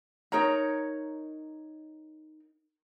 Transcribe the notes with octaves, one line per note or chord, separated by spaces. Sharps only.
D#4 A#4 C#5 A#5